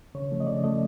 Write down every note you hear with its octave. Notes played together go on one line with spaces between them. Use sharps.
C#3 C#5
F3 A3
D#5
C#3 D5
F3 A3 D#5